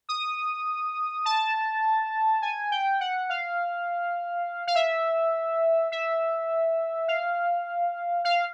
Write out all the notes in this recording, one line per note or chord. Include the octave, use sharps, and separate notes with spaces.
D#6
A5
G#5
G5
F#5
F5
F5
E5
E5
F5
F5